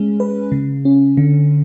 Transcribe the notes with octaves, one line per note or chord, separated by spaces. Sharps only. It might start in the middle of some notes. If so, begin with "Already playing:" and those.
Already playing: G#3 C#4
B4
C#3
C#4
D3